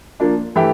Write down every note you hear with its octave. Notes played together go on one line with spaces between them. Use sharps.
F3 A#3 D4
E3 A3 E4 G4